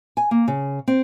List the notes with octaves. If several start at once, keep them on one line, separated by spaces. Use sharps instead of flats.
G#5
A#3
C#3
C4